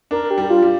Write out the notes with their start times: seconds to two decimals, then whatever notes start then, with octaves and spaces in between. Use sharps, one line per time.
0.11 D4 A#4
0.31 G4
0.38 G3
0.50 F4
0.62 G3